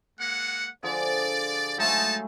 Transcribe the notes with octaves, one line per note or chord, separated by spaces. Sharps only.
G#3 A#3 F#5
D3 F3 G#4 D5
F#3 G#3 A3 D#4 A5